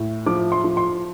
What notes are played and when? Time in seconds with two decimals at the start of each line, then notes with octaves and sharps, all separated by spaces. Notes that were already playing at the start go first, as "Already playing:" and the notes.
Already playing: A2
0.26 F3 D6
0.52 C6
0.64 F3
0.77 C6